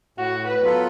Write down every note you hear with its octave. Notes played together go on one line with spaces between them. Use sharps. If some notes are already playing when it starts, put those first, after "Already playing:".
A2 F#4
B4
F#3 B3 F4 A4